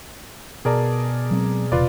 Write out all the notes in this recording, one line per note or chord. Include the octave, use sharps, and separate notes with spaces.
B2 G#4 A#4 D5 A5
F#3 G#3 C4
E1 C3 F4 B4 D5